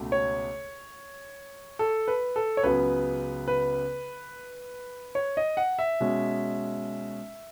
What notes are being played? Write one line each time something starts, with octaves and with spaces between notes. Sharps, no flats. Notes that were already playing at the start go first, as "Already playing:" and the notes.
Already playing: C#2 B2 A3
C#5
A4
B4
A4
C#5
C#2 C#3 F#3 B3 B4
B4
C#5
D#5
F#5
E5
B2 G#3 C#4